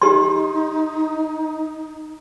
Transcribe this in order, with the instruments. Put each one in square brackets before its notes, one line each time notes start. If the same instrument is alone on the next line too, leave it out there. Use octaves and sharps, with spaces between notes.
[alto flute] D#4 [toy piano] G4 C6